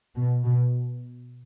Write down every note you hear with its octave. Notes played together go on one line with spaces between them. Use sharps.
B2
B2